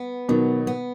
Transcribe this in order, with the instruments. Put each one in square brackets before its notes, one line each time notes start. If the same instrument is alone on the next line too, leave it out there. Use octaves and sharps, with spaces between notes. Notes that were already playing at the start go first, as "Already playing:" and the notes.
Already playing: [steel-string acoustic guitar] B3
[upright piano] B2 D#3 [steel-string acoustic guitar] F#3
[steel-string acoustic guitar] B3